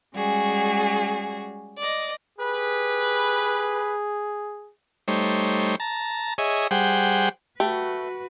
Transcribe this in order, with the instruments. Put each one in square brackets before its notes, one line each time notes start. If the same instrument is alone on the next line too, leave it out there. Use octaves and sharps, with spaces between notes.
[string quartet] G3 G#3 C#4 F#4 G#4
D5 D#5
[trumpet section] G4 B4 [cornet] G#4
[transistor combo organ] G3 A3 D#4 C5 C#5
A5 A#5
G#4 C#5 D#5 E5
G3 G#4 C5 F#5 G5
[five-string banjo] A3 [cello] F#4 B4 [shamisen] G4